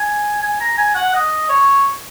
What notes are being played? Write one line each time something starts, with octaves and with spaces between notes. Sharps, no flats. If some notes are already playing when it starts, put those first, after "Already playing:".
Already playing: G#5
G#5
A#5
G#5
F#5
D#5
C#5